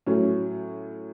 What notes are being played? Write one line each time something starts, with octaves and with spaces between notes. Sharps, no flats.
A2 F#3 C#4